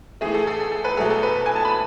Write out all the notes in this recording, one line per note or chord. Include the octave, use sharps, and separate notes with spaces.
A2 E3 A3 G#4
A4
A4
A4
A4
B4
E2 B2 F#3 A3 A4
A4
B4
G#5
A5
B5